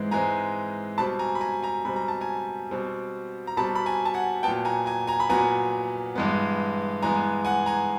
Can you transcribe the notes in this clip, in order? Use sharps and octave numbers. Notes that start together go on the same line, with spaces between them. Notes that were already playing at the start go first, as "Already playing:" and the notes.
Already playing: G#2 E3 G#3 C4
G#2 E3 G#3 C4 G#5 A#5
B2 G3 C4 A5 B5
G#5 A#5
B5
G#5 A#5
G#5 A#5
B2 G3 C4 B5
A#5
A5
G#5 A#5
B2 G3 C4
A#5
B2 G3 C4 A5 B5
B5
G#5 A#5
A5
F#5 G#5
A#2 F#3 B3 G5 A5
G#5 A#5
G#5 A#5
G#5 A#5
B5
A#2 F#3 B3 G#5 A#5
G2 E3 G#3 B3
G2 E3 G#3 B3 G#5 A#5
F#5 G#5
G#5 A#5